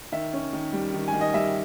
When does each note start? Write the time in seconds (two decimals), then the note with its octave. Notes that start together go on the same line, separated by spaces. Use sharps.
0.12 D#3 E5
0.33 C#4
0.53 D#3
0.73 G3
0.94 D#3
1.08 G#5
1.14 D#3
1.21 D#5
1.34 G3 E5